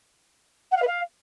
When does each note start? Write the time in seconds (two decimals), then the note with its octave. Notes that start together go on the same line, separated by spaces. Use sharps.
0.72 F#5
0.77 F5
0.82 B4
0.87 F5